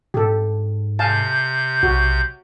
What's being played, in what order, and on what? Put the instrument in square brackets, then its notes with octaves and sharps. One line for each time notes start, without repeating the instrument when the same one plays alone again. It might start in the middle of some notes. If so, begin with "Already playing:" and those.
[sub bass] G#2 [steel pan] G4 A4
[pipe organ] C3 G6 [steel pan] F5 G#5 A5
[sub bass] B1 [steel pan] F#4